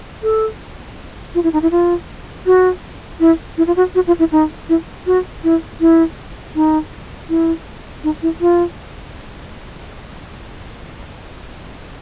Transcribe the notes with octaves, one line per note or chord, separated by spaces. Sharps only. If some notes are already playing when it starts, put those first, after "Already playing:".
A4
F4
E4
D#4
E4
F4
F#4
E4
E4
F4
F#4
F#4
F4
E4
D#4
E4
F#4
E4
E4
D#4
E4
D#4
E4
F4